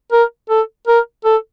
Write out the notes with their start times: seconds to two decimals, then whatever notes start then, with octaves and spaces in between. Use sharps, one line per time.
0.12 A#4
0.50 A4
0.88 A#4
1.25 A4